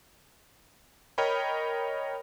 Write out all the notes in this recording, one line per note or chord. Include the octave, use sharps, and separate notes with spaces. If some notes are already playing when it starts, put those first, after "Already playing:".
A#4 C#5 D#5 G5 B5